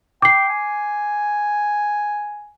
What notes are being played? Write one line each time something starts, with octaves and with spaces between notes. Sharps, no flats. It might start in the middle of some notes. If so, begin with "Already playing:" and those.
G5 D6 C7
G#5